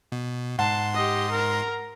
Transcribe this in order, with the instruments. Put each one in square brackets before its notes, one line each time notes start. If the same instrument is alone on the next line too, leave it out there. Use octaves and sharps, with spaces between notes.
[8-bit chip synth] B2
[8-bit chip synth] G#2 C6 [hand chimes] F#5 [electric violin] A5
[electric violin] G4 D#5
A#4 A#5